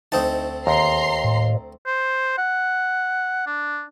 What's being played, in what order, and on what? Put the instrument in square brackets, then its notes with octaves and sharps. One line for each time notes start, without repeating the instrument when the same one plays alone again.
[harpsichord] D2 C4 A5 [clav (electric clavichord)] D#4
[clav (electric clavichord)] D#2 [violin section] A#5 C6 C7
[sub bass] A2
[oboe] C5
F#5
D4